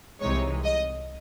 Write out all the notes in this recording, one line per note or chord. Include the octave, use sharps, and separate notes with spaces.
C2 C3 E3 G#3 D#4 C#5
D#5